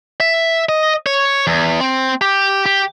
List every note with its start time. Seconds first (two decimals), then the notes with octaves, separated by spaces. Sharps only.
0.20 E5
0.69 D#5
1.06 C#5
1.47 E2
1.81 C4
2.21 G4
2.66 G4